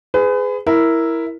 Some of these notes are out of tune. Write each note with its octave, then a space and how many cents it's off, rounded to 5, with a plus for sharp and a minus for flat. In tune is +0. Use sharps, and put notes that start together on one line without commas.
G#4 +0 B4 +35
E4 +0 A#4 +0